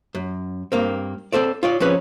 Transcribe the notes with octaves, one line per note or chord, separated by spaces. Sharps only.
F#2
G2 A#3 C4
C4 A4 C5 D5
F4 C#5 D5
F3 C4 C#4 G#4 B4 C#5